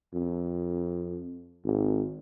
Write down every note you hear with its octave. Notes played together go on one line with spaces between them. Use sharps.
F2
G#1